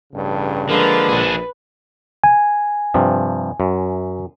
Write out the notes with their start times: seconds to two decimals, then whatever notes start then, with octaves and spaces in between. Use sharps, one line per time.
0.12 A1 G2 C#3
0.69 D3 F3 G#3 A#3 B4
1.09 A#1 D4 G#4
2.24 G#5
2.94 G2 C3 F3
3.60 F#2